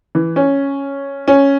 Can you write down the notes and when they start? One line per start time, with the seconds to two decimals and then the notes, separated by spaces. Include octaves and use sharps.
0.15 E3
0.36 C#4
1.28 C#4